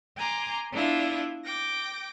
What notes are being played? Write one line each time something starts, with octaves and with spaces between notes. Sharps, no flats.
G#5 A#5 C6 D6
B3 D4 E4 F4 E5
G5 D6 A#6